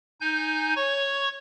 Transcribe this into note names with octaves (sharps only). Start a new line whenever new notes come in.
D#4 G#5 G6
C#5 C#6